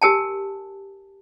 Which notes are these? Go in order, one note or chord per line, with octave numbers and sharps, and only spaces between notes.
G4 A#4 G#5 A5